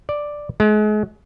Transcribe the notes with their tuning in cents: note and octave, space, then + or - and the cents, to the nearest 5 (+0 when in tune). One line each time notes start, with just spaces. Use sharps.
D5 +5
G#3 +35